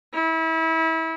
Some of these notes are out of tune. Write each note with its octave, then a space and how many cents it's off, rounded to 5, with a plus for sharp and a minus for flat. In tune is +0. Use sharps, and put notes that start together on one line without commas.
E4 -30